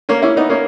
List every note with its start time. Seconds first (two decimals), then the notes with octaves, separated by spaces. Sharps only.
0.09 A#3 C#4
0.22 C#4 E4
0.36 B3 D#4
0.50 A#3 C#4